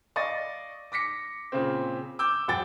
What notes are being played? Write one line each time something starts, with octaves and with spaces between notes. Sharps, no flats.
D5 D#5 F5 C#6 A6
D6 A#6 B6 C#7
A#2 C#3 C4
D6 E6 G6
E1 F#3 F#5 G5 A6